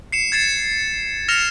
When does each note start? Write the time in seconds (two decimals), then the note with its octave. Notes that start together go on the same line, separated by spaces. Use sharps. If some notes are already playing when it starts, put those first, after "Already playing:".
0.12 C7 C#7 E7
0.32 G#6 A6 C7 E7
1.28 F6 A#6 C#7 E7 F7